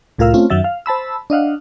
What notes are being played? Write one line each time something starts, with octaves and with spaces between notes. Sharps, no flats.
C2 A2 F4 A#4 F5 E6
A3 C4 C#4 F4
F#2 D#3 F#3 E5 A6
F5
C5 A5 B5 E6
D4 D#5 F5 F#5